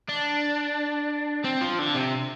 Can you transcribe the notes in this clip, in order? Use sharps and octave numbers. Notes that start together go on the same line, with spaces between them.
D4
C4
F3
D3
C3